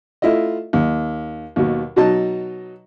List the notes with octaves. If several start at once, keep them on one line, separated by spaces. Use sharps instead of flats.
A3 E4 F4 D#5
D#2
D#2 B2
B2 F#3 D#4 D#5 A5